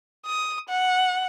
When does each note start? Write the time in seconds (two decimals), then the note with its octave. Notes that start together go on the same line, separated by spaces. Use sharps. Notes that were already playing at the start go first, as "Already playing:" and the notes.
0.26 D#6
0.69 F#5